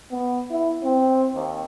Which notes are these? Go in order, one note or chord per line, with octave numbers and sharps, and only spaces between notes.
B3
E4
C4
D#2